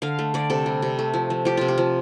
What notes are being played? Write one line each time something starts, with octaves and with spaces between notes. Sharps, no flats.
D3 F5
A3
D3 D5
C3 A4
G3
C3
A3
F3
F3
F3 G4
C3 F4
G4
F3